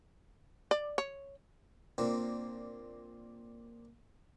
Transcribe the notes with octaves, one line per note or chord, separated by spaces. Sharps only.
D5
C#5
A#2 A#3 C4 D4